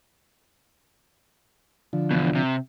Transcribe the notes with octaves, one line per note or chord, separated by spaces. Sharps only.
D3 F3
E2 G2 B2
C3